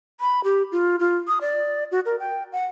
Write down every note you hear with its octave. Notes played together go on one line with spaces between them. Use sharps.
B5
G4
F4
F4
D#6
D5
F#4
A#4
G5
F#5